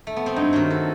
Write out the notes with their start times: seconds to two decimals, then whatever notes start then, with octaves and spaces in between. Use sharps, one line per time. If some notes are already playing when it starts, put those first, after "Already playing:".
0.07 A3
0.16 B3
0.26 C4
0.36 G2 D#4
0.53 D#3 F#3 F#4
0.70 A4